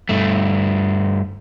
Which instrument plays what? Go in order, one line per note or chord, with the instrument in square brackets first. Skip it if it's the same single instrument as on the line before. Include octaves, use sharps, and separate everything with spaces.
[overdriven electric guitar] G2 A3